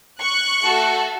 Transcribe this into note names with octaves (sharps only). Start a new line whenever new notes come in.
C#6 F#6
A3 F#4 A4